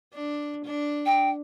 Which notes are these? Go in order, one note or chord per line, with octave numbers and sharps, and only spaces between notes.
D4
D4
G5